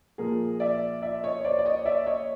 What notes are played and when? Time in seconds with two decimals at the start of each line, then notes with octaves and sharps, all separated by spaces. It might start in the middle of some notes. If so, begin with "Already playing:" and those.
0.18 A#2 F3 G#4 A#4
0.60 D5 E5
1.02 D5 E5
1.24 C#5 D#5
1.44 C5 D5
1.59 D5
1.65 C#5 D#5
1.85 D5 E5
2.06 C#5 D#5